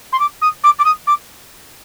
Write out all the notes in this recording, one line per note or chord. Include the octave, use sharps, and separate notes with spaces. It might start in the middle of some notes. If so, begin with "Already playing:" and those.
C6
D6
D#6
D6
D6
D#6
D6